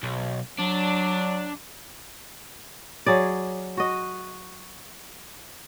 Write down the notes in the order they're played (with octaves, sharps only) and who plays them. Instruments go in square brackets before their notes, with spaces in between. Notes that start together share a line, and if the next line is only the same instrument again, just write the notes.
[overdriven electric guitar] B1
[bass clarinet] F#3 [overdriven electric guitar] D4
[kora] F#3 G#4 D5
F#4 D#5